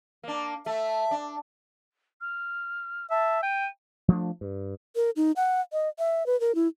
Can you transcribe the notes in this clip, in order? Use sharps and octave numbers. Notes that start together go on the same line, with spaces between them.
A#3 D4
A3 E5
D4
F6
E5 A5
G5 D#7
F3 A3 D4
G2
A#4
D#4
F#5
D#5
E5
B4
A#4
E4